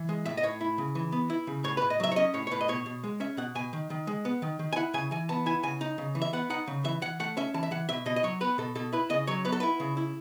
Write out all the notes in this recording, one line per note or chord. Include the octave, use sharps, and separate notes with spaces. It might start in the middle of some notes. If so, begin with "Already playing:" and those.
Already playing: E3
G#3
A2 E5
D#5
A2 C#5
E4
C#3
E3
B3
E4
C#3
A2 C#5
A2 B4
D#5
F#3 E5
C#5
C#4 D#5
A2 C#5
C#5
A2 B4
D#5
B2 C#5
B2
G#3
C#4 E5
B2 F#5
B2 G#5
D#3
D#3
G#3
B3
D#3
D#3
G#5
E4 F#5
C#3 G#5
E3 G#5
B3 A5
E4 G#5
C#3 G#5
D#4
C#3
E3
E5
B3 F#5
D#4 F#5
C#3
E3 E5
E3 F#5
A3 F#5
C#4 E5
E3 A5
E5
E3 F#5
B2 E5
B2 D#5
D#5
F#3 C#5
B3 B4
B2 A4
B2 A4
E4 B4
C#3 D#5
F#3 C#5
B3 B4
A4
E4 B4
C#3
E4